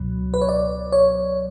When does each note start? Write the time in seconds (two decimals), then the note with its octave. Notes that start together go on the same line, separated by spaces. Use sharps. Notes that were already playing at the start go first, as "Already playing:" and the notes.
Already playing: C#2 B2 F#3
0.34 B4
0.41 C#5
0.49 D5
0.92 C#5